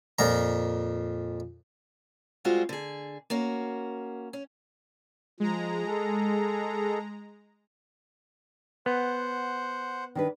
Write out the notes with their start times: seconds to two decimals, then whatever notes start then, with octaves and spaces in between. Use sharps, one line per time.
0.19 F2 A#2 A#5
2.45 G3 G#3 C4 F4 F#4 G#4
2.69 D3 G#4
3.30 A#3 C#4 F#4
4.33 C#4
5.40 F3 G#3 A#5
5.87 G#4 A4
8.86 B3 C5 F#5
10.15 D#3 D4 B4